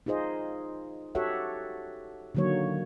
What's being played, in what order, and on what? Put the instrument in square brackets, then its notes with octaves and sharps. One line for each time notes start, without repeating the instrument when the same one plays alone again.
[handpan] D#4 F4 G#4 C5 D#5
F#4 G4 A4 C#5 E5 F#5
D3 D#3 F#3 A#3 C#5